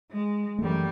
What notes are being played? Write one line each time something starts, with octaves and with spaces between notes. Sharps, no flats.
G#3
F#2 E3 G3 A3